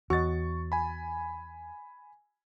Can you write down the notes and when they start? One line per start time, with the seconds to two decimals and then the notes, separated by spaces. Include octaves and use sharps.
0.10 E2 F#4 D#5 C#6 A6
0.72 G#5 B5